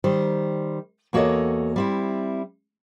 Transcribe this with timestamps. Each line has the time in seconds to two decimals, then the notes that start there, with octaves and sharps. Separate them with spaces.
0.04 D#3 G3 C5
1.13 E2 A#3 F#4 A4 C#5 D#5
1.76 G3 C4 E4